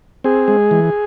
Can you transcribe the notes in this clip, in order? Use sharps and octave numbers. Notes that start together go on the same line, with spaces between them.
C4 G#4
G#3
E3